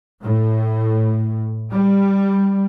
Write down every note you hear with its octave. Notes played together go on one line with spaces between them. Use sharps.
A2
G3